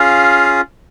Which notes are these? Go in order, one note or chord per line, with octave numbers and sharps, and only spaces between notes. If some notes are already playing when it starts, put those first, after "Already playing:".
Already playing: C#4 F4 G#4 F5